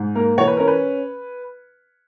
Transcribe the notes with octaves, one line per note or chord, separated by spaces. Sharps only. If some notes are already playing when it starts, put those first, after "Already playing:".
Already playing: G#2
A#3 A#4
E3 C#5
B4
C#4 A#4
B4